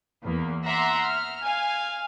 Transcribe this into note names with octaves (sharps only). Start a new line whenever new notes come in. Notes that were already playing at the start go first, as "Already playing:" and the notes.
E2 A#3
E5 F#5 A#5 C6 D6
F6
F5 G#5